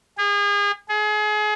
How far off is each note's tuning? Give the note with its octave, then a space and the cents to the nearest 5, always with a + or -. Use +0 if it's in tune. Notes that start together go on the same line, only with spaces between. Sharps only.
G#4 -35
G#4 +30